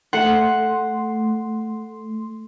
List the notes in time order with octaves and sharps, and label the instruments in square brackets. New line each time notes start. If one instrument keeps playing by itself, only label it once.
[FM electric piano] A3 C6 [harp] F#5